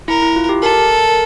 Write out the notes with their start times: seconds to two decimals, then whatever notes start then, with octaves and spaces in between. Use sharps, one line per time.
0.08 E4 A#4
0.22 E4
0.36 F4
0.49 G4
0.62 A4 A#4
1.09 A#4